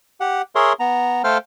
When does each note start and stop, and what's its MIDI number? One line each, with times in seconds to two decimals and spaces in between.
0.20 0.42 67
0.20 0.42 78
0.55 0.73 68
0.55 0.73 70
0.55 0.73 73
0.55 0.73 76
0.55 0.73 84
0.80 1.22 59
0.80 1.22 82
1.24 1.38 57
1.24 1.38 69
1.24 1.38 72
1.24 1.38 77
1.24 1.38 79
1.24 1.38 89